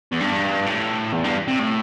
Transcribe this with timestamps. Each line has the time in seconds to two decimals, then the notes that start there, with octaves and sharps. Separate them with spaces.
0.12 E2
0.20 G2
0.66 A2
1.13 E2
1.24 G2
1.48 C3
1.59 A2